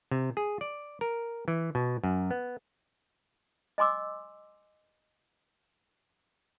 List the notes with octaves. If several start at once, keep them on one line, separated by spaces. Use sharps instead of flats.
C3
G#4
D5
A#4
E3
B2
F#2
B3
D#5 G#5 C6 D6 E6